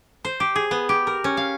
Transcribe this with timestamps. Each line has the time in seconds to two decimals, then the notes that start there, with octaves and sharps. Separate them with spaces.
0.25 C5
0.40 G4
0.56 G#4
0.71 B3
0.89 G4
1.07 A#4
1.24 C#4
1.37 F5